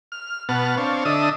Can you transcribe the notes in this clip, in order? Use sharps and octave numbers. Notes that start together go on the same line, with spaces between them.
F6
B2 B3 F#5 A5 F6
C4 D4 C#5 F5 A5
D3 D4 A4 D#5 E5 D#6